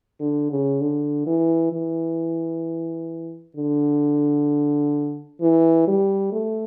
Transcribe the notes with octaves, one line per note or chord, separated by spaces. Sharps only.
D3
C#3
D3
E3
E3
D3
E3
G3
A3